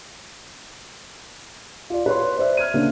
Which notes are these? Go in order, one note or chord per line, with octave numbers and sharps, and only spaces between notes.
F4 D5
B4 C#5 C6
C5 D5 E5
F6 G#6 D#7
C#3 A#3 D4